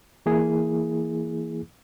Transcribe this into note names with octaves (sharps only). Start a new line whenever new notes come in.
E3 A#3 E4 G#4